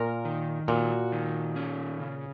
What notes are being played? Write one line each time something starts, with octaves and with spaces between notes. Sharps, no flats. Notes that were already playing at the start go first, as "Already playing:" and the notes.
Already playing: A#2 A#4
D#3
A#2 F#4
D#3
C#4
C#3